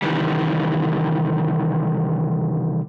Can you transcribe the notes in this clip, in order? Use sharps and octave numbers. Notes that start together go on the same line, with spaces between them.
C3 D#3 E3 G3